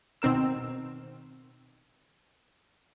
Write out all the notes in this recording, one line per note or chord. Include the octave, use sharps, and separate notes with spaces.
B2 D#3 C4 A#4 E6